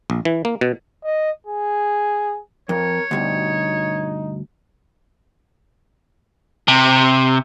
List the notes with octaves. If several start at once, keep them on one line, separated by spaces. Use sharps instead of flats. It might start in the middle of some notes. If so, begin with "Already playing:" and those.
A#1
E3
A#3
B2
D#5
G#4
F2 A#4 C#5
D2 G2 B2 D#4
C3